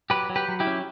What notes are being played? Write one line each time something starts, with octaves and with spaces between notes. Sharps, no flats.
F#3 G4 B4
F#3
G4 B4
F#3
E4 G4
C#4